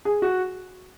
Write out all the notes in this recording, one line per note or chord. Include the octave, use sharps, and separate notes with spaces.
G#4
F#4